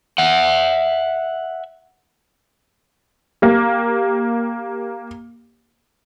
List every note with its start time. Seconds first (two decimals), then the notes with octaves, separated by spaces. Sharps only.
0.18 E5 F#5
3.42 A#3 G4